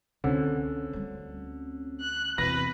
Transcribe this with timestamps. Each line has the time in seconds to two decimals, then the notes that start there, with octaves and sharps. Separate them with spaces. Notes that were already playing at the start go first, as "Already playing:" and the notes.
0.24 C#2 D3 C4 C#4
0.93 D2 G3
2.01 F#6
2.38 E2 C3 B4 A#6